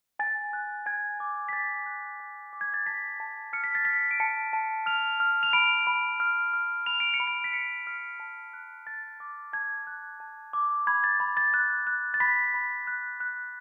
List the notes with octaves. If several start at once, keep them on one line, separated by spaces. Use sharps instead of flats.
G#5 A6
F#6
G#5 G#6
D6
B6
G#5 A6
F#6
G#5
D6
G#6
A6
A5 B6
A5
F6 C#7
B6
A6
F6 B6
D7
A5 C#7
A5
F6 F7
F6
F7
B5 D7
B5
F6
F6
B5 F7
D7
C#7
B5
D7
B6
F6 C#7
F6
A5
F#6
A5 A6
D6
A5 G#6
F#6
A5
D6
B5 G#6
A6
B5
A6
F#6 A6
F#6
A6
B5 B6
B5
F#6
F#6